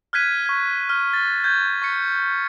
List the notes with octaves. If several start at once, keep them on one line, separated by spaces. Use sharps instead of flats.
F6 F#6 G#6 B6 D#7
C#6 G#6
F6
A6
G6 G#6
C#6 B6 C#7